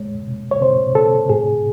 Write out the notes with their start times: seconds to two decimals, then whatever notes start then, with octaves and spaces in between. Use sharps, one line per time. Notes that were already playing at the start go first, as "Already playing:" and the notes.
Already playing: G#3 C#5
0.27 C3
0.51 C#5
0.61 C3 C5
0.95 C3 A4
1.29 A2 G#4